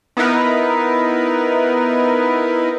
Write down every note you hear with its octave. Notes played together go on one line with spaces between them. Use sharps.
B3 D#4 E4 A#4 B4